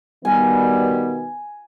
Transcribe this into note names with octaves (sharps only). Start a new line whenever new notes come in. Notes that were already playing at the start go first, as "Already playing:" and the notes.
B2 D#3 G3 B3 G#5